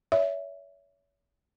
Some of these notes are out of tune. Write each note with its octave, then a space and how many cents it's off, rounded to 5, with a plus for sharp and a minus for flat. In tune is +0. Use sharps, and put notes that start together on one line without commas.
C#5 +35 E5 +0